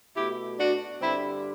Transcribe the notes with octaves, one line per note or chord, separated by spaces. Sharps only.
B2 A3 E4 G4
D4 F#4
G2 D3 G3 C4 E4